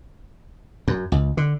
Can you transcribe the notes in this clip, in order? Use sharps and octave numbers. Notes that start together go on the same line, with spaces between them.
F#2
C#2
D3